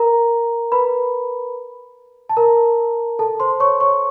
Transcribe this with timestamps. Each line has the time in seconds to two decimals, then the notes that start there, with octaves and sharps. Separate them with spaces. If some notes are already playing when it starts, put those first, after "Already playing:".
Already playing: A#4 A#5
0.72 B4 B5
2.29 A5
2.37 A#4 A#5
3.19 A4 A5
3.40 C5 C6
3.60 C#5 C#6
3.81 C#5 C#6